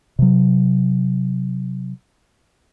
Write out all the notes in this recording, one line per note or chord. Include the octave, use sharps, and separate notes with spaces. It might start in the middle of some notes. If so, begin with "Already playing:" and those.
C3 F#3